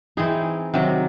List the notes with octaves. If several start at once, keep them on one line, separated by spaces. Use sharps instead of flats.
E3 C4 D#4 G#4
C3 D#3 F#3